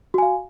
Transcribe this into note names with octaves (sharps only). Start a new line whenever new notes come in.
F#4 F5 G#5